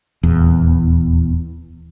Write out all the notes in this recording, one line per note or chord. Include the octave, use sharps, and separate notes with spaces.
D#1 E2